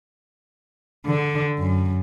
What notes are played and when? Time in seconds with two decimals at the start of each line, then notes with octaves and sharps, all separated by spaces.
1.06 D3
1.59 F#2